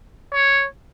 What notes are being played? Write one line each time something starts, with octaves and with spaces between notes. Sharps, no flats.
C#5